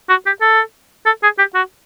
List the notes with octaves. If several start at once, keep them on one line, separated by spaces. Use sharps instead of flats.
F#4
G4
A4
A4
G#4
G4
F#4